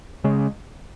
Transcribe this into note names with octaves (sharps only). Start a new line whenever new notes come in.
C#3 G#3 C#4